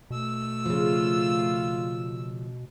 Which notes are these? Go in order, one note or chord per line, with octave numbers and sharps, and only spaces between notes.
B2 A3 E6
C#3 F3 F4